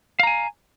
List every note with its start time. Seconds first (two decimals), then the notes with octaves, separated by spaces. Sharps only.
0.20 F5
0.23 A#5
0.27 G#5